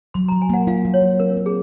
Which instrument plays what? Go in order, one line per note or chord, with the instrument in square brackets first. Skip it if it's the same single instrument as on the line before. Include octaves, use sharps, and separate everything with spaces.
[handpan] F#3 [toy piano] C6
[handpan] F#3 [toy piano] A#5
[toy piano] G#5
[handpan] A#3 [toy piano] F#5
[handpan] F4 [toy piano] F5
[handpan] F#3
[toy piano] C#5
[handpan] F#3
[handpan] C4 [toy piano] A#4
[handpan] C4
[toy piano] G#4